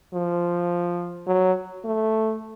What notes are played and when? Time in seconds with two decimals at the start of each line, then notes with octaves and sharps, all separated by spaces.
0.14 F3
1.27 F#3
1.85 A3